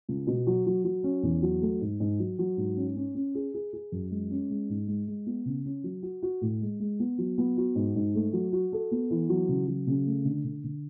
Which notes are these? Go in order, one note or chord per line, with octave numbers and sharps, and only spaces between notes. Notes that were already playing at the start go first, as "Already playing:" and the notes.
C#2
B2
F#3
F#3
F#3
C#4
E2
F#3
A3
G#2
G#2
F#3
F#3
G#2
C#4
C#4
C#4
G#4
G#4
G#4
F#2
G#3
C#4
G#3
G#2
G#3
G#3
B3
C#3
C#4
F#3
F#4
F#4
A2
G#3
G#3
B3
F#3
B3
F#4
G#2
G#2
A3
F#3
F#4
A4
B3
E3
F#3
C#3
F#3
C#3
A3
D3
D3
D3